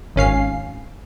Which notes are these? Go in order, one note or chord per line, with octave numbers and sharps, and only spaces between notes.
G#1 C#4 F5 C7